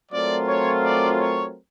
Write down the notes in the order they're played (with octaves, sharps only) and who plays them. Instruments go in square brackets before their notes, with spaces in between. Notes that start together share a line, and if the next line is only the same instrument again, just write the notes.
[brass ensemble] F#3 A3 C4 F4 A#4 [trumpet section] D5
[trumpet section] C#5
D5
C#5